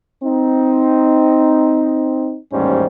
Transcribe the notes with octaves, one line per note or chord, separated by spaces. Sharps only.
C4 D#4
A1 D#2 G#2 G3 C#4 C5